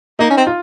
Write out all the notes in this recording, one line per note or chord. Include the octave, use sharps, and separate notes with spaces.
A#3 D#4
C#4
C4
F4